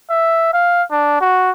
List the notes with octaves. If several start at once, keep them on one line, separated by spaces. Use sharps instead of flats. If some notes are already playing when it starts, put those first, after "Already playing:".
E5
F5
D4
F#4